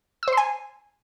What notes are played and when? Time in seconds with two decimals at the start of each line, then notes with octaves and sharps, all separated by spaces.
0.23 E6
0.28 C5
0.32 C6
0.37 G#5